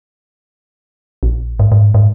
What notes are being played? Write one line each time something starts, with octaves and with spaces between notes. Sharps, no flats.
A#1
G#2
G#2
G#2